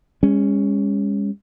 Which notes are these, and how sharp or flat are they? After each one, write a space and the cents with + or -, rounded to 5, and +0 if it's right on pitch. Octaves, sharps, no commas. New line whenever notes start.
G#3 -40 C#4 +0